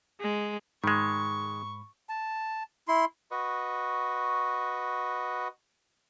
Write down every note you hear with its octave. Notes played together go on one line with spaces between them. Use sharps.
G#3
G#2 D#3 G#3 B5 C#6
A5
E4 C6
F#4 B4 D#5 C#6